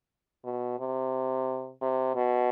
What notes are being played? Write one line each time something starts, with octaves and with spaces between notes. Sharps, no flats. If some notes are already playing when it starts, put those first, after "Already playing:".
B2
C3
C3
B2